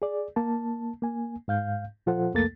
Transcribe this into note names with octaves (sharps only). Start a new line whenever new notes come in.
G#4 D5
A#3 A5
A#3 G#5
G#2 F5 G6
A#2 F3 F4 A4 C5 F#5
C2 F2 A3 A#3 A4 A6